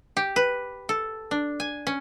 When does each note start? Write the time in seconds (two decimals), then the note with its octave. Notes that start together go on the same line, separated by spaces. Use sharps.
0.17 G4
0.36 B4
0.89 A4
1.31 D4
1.60 G#5
1.87 C#4